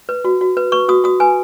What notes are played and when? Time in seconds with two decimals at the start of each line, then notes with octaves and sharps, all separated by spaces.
0.09 B4
0.25 F#4
0.41 F#4
0.57 B4
0.72 B4 C#6
0.89 F#4 D#6
1.04 F#4 D#6
1.20 B4 G#5